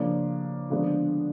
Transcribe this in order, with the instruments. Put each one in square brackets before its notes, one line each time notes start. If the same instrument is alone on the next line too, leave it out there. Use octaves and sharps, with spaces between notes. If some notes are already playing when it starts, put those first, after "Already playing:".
Already playing: [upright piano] C#3 F3 A#3 D4
D3 F3 G#3 B3 D4